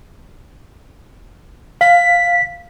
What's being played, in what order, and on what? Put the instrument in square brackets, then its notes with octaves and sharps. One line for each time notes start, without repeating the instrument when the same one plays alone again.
[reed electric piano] F5 [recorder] B6